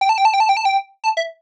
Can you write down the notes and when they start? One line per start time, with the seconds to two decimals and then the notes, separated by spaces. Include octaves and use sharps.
0.01 G5
0.09 A5
0.18 G5
0.25 A5
0.34 G5
0.40 A5
0.49 G5
0.57 A5
0.65 G5
1.04 A5
1.17 E5